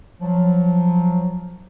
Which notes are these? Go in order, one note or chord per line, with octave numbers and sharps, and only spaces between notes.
F3 F#3